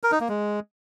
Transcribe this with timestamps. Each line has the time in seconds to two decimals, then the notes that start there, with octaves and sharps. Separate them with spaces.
0.03 A#4
0.12 D#4
0.20 A#3
0.28 G#3